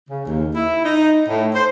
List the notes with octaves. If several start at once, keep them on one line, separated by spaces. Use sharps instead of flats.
C#3
D#2
E4
D#4
A2
C5